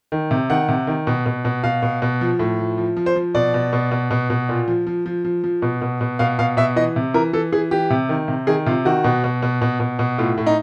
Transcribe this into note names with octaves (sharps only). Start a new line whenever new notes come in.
D#3
C3
D#3 F#5
C3
D#3
B2
B2
B2
B2 F5
B2
B2
F3
A2
F3
F3
F3
C5
F3
B2 D5
B2
B2
B2
B2
B2
A#2
F3
F3
F3
F3
F3
B2
B2
B2
B2 F5
B2 F5
B2 E5
E3 D#5
C3
E3 A#4
E3 A4
E3 G#4
E3 G4
C3
D#3
C3
D#3 G#4
C3 F4
D#3 F#4
B2
B2
B2
B2
B2
B2
A2 F4
A2
D#4